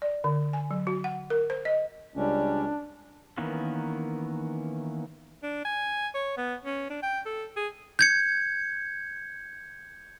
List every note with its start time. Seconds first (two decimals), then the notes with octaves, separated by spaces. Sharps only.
0.02 D5
0.24 D3
0.53 G#5
0.71 F#3
0.87 F#4
1.04 F#5
1.30 A#4
1.50 C5
1.65 D#5
2.16 C#2 G3 C#4 D4
3.38 D#3 E3 A#3 B3 C#4
5.43 D4
5.65 G#5
6.14 C#5
6.37 B3
6.65 C#4
6.90 D4
7.03 G5
7.25 A4
7.56 G#4
7.99 G6 G#6 C#7